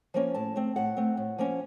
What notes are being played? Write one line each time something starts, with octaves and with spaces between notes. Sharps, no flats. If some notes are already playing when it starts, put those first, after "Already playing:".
F3 A#3 C#4
A2 A5
A3 C4
A2 F#5
A3 C4
A2
F3 A#3 C#4